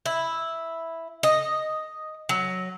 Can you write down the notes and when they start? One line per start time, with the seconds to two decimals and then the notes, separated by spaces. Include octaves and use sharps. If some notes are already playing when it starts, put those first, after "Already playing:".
0.06 E4
1.23 D#5
2.29 F#3